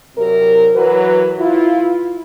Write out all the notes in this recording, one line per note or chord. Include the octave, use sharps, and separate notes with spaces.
C2 C3 F#3 A#4
E3 F#3 B4
E4 F4